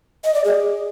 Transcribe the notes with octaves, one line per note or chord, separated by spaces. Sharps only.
D#5
D5
G#4